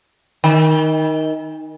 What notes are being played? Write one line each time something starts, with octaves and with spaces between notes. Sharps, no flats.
D#3